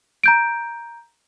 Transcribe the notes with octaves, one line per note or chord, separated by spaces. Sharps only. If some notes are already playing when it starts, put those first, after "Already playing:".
A#5 G6 D7